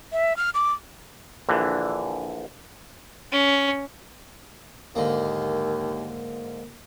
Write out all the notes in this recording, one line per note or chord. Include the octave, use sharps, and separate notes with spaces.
E5
F6
D6
A#1 D3 E3
C#4
D#2 G#2 D3 A#3